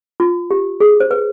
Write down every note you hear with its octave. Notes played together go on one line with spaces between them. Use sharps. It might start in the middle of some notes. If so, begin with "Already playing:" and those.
F4
G4
G#4
C5
B4